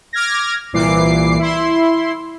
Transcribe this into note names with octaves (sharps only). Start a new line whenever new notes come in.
D6 F6 G#6 A#6
C2 A#2 E3 D6 C7
E4 C6